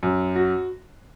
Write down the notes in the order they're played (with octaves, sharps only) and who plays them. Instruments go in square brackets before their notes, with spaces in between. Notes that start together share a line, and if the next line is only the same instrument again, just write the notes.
[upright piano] F#2
F#4